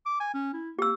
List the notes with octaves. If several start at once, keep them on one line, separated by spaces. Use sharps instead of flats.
D6
G#5
C#4
E4
A#3 G4 E6